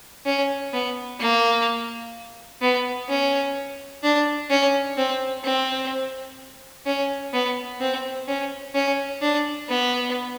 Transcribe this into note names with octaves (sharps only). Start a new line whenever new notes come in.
C#4
B3
A#3
B3
C#4
D4
C#4
C4
C4
C#4
B3
C4
C#4
C#4
D4
B3